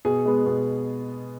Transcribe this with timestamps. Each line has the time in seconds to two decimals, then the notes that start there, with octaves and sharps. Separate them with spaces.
0.05 B2 G#4
0.25 G#3 B3
0.46 B2